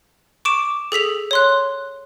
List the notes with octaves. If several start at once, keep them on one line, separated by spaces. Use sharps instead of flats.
C#6 D6 D7 E7
G#4 A4 B6 F7
C#5 C6 F#6